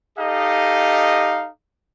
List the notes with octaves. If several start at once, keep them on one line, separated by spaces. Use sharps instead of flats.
D#4 G4 A4 D#5 F5